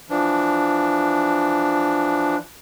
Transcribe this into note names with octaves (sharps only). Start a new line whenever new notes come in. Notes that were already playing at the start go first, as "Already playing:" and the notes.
E3 F3 D4